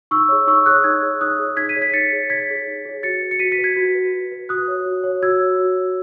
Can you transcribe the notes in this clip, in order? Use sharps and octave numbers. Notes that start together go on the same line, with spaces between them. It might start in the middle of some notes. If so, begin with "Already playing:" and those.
D#4 C#6 E6
G#4 C#5
D#4 C#6 E6
G#4 C#5 D#6 F#6
D#4 E6 G#6
G#4 C#5
D#4 D#6 F#6
G#4 C#5
D#4 G#6 B6
B6 D#7
G#4 C#5
G#6 B6
D#4 A6 C#7
G#4 C#5
D#4 G#6 B6
G#4 C#5
D#4
G#4 C#5
F#4 A6 C#7
B4
C#7
F#4 B6 D#7
B6 D#7
B4
G#6 B6
F#4
B4
F#4
B4
F#4 D#6 F#6
C#5
F#4
C#5
F#4 E6 G#6
C#5
F#4
C#5